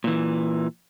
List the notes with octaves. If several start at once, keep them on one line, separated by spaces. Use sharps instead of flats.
A#2 E3